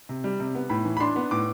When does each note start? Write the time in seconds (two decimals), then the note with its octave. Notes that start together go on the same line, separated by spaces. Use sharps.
0.09 C3
0.24 G3
0.40 C3
0.55 B3
0.70 A2 B5
0.85 E3
0.97 B5
1.00 D4 C6
1.16 B3
1.31 A2 D6